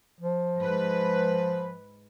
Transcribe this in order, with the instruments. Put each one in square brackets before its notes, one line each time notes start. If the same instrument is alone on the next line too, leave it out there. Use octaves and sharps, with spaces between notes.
[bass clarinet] F3
[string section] G#2 B4